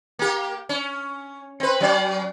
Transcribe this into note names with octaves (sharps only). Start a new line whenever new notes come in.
A#3 G4
C#4
C4 B4
F#3 C#4 D5